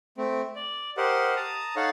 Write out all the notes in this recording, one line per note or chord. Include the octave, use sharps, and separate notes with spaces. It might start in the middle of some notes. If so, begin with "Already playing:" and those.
A3 C4
D5
G4 A#4 C5 D#5 F#5
A5 A#5 D#6
D#4 A4 C#5 F5 F#5